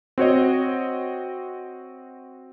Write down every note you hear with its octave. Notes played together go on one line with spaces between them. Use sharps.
C4 F#4 C#5 D#5